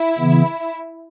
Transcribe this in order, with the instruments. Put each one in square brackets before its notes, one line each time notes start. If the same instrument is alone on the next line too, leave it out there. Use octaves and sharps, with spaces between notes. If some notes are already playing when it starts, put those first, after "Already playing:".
Already playing: [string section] E4
[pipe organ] C#3 E3 B3